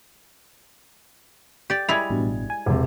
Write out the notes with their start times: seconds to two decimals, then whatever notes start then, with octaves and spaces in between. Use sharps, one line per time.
1.70 G4 D5
1.89 G3 G#3 E4 G#6 F7
2.10 A1 G2 B2
2.50 G#5
2.66 E1 C3